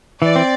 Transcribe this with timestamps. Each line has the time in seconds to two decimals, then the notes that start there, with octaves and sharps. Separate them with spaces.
0.21 E3 D5
0.36 C4